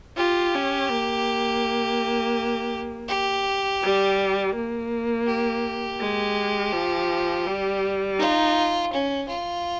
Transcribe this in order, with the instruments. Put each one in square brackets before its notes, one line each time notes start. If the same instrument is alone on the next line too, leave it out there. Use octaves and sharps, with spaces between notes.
[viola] F4 [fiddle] G4
[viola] C#4
A#3
[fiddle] G4
[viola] G3
A#3
[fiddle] G4
[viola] G#3
F3
G3
[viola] D#4 [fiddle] F4
[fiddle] C#4
F4